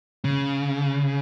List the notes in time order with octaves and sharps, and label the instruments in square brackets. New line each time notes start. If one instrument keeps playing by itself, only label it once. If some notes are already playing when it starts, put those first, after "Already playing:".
[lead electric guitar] C#3